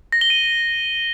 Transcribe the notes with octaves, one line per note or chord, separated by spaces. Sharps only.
A#6
G7
D#7